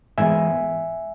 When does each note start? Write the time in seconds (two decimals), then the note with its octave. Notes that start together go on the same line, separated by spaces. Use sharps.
0.18 G#2 E3 G#3 B3 E5 G#5